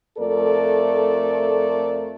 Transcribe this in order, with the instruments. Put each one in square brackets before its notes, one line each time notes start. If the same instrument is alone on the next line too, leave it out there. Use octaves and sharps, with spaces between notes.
[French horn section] F2 A3 A4 A#4 D5